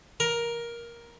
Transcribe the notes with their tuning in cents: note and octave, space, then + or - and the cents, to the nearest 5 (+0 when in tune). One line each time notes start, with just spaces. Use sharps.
A#4 +10